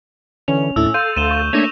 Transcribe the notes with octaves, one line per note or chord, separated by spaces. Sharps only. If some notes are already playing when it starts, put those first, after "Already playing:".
D3 E3 C#4 F7
D#2 A2 A3 D4 E4 E6
A4 F5 C6 G6 D#7
D2 D#7 E7 G7
C#6
A3 A#3 D4 C#5 E5 G#5 A#6 F7